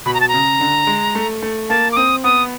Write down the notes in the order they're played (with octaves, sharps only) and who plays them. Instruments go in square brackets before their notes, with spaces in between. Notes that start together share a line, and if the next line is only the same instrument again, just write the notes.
[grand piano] B2 [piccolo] B5
[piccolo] A#5
A5
A#5
[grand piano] C#3
D3
G#3
A3
A3
[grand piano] A#3 [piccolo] A5
[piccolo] D6
[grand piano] C4 [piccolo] D#6
[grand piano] B3 [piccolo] D#6